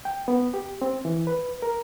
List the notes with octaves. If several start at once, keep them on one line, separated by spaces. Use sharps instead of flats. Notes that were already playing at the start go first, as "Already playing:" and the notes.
G5
B3
G4
C4
E3
B4
A#4